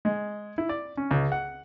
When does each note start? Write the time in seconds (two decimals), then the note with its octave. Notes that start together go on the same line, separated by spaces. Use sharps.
0.05 G#3
0.58 E4
0.69 D5
0.97 C#4
1.11 C#2
1.32 F#5